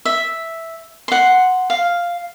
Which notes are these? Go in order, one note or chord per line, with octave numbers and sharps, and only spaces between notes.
E5
F#5 C6
F5